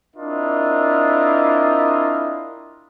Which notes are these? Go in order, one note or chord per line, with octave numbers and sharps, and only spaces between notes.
C4 D4 E4 F4 A#4 D#5